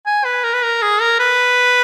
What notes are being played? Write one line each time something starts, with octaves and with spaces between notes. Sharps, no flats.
G#5
B4
A#4
B4
A#4
G#4
A#4
B4